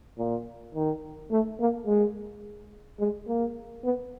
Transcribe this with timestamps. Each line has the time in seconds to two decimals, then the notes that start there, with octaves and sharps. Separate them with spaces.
0.18 A#2
0.74 D#3
1.31 A3
1.60 A#3
1.87 G#3
2.99 G#3
3.27 A#3
3.84 B3